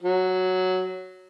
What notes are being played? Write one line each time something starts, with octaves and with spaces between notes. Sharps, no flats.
F#3